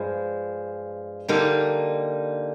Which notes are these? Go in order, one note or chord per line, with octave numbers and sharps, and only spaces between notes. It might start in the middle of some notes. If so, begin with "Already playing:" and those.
Already playing: G2 F3 G#3
D3 G3 A#3 D#4